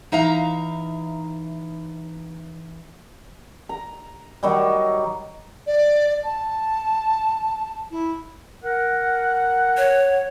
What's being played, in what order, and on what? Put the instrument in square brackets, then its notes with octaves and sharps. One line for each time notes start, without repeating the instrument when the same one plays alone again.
[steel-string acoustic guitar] E3 D#4 E5 F5 A#5
[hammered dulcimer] A#5
D#3 F#3 G3
[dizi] D5
A5
E4
[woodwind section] A#4 F#5
[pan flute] C#5